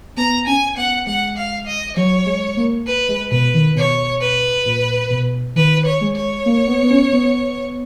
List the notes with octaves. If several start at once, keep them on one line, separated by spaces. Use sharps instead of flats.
B3 A#5
C#4 G#5
B3 F#5
G#3 F#5
F5
D#5
F#3 C#5
G#3
A#3
B4
G#3
B2 B4
D#3
B2 C#5
B4
A#2
B2
D#3 B4
C#5
G#3
C#5
A#3
B3
B3
C#4
B3